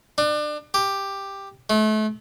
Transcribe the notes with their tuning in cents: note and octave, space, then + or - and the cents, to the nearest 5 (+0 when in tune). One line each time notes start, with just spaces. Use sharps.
D4 +30
G4 +5
A3 -35